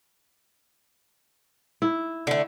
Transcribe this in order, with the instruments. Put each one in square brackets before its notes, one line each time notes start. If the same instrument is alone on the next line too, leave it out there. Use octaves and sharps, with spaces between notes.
[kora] E4
[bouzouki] D3 A3